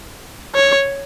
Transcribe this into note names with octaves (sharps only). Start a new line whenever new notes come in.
C#5